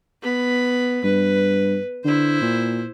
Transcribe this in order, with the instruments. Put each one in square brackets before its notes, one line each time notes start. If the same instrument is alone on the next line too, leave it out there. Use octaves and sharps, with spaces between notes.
[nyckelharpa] B3 B5
[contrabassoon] G2 [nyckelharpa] B4
[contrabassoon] D3 [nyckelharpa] E4 C5
[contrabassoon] A#2